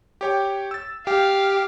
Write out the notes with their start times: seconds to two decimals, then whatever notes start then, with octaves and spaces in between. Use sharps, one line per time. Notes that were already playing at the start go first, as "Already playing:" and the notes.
0.21 G4 C#5 G5
0.71 E6 A6
1.07 G4 F5 G5